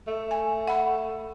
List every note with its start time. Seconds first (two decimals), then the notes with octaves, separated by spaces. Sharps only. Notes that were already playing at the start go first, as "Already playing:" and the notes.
0.08 A3
0.31 G#5
0.68 F#5 B5